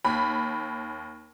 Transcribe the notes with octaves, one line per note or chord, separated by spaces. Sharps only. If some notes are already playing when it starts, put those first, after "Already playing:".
D#2 B5